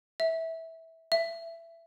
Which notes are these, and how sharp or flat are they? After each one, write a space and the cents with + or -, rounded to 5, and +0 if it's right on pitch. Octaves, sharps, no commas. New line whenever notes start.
E5 -15
E5 +15